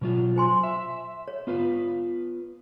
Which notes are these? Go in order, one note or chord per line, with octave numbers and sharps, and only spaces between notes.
B2 F#3 F4
C5 G#5 C6
E5
C#5
B3 F4 B4